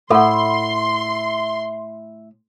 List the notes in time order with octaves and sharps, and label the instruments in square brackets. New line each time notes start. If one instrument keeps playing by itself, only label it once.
[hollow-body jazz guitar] A2 [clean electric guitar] E4 [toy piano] A4 F#5 [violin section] C6